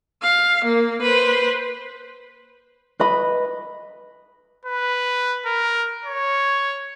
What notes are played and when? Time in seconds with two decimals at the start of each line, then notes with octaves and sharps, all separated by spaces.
0.22 F5
0.65 A#3
1.02 B4 C5
3.00 B4 D#5 B5
4.65 B4
5.46 A#4
6.04 C#5